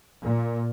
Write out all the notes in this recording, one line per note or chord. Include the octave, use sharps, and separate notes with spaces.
A#2